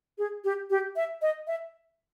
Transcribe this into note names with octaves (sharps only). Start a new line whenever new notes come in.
G#4
G4
G4
E5
D#5
E5